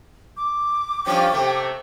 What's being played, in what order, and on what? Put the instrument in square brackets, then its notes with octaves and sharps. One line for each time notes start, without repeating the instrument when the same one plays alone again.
[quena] D6
[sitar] G2 F3 C#4 [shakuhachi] G5
[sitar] C3 A3